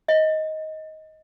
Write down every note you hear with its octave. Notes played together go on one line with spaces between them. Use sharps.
D#5